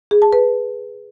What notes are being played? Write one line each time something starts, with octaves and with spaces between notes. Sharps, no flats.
G#4
A5
B4